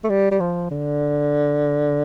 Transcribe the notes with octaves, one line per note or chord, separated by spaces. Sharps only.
A3
G3
G3
F3
D3